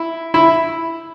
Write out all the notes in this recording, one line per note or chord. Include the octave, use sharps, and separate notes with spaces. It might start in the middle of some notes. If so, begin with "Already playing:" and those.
Already playing: E4
E4